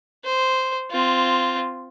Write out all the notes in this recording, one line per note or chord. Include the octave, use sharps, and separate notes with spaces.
C5
C4 F4